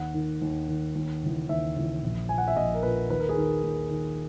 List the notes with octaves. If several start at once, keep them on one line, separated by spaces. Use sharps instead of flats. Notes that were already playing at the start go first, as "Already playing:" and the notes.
Already playing: D#2 F#5
D#3
D#2
D#3
D#2
C#3 E3
D#2 E5
C#3 E3
A#1
A#2 G#5
F#5
E5
A#1 D#5
A#4
A#2 B4
D#2 B4
A#4
G#4
D#3 A#4
D#2
D#3